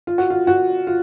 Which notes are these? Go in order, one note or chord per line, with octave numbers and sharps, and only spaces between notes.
F4
F#4
F4
F#4
F4